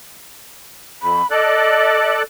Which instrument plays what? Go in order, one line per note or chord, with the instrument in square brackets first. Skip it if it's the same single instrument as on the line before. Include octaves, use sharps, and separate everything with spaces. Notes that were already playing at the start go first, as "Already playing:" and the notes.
[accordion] F2 [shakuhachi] B5
[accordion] A4 D5 F#6 [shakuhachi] D#5